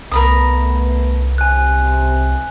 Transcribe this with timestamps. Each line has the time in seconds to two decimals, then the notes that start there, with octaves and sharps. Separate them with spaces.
0.12 C2 A3 B3 A#4 B4 B5 D#6
1.38 C3 G#5 F#6